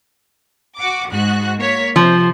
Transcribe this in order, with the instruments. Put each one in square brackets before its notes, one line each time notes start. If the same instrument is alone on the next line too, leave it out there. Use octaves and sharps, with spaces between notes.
[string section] F#4 F#5 D6
G#2 F#4 F#6
A#3 C#5 B6
[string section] C3 C5 [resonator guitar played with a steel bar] F3